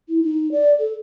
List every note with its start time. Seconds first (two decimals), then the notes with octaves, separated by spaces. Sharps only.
0.09 E4
0.23 D#4
0.52 D5
0.79 A4